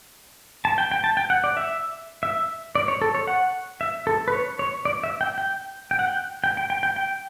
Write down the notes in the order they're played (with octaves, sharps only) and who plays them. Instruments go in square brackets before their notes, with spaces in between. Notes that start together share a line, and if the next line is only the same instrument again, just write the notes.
[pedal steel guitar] A5
G5
G5
A5
G5
F#5
D5
E5
E5
D5
C#5
A4
C#5
F#5
E5
A4
B4
C#5
C#5
D5
E5
G5
G5
G5
F#5
G5
G5
G5
G5
G5
G5